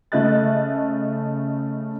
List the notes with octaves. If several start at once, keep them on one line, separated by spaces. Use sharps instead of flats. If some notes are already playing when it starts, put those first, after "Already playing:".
C#3 A3 D#5 E5 F#6 A6